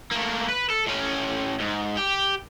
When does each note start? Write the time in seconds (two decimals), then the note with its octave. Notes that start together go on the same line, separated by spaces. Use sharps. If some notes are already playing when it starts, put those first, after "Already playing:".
0.12 A3 A#3
0.49 B4
0.70 A4
0.87 A2 C#4
1.60 G#2
1.97 G4